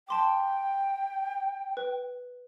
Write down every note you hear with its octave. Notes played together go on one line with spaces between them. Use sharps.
G5 A5 C6 D6
B4